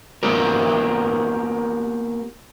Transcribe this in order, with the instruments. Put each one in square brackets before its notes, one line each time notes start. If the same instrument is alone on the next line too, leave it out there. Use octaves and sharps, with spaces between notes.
[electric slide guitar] A#3 B3 F4 G4 A#4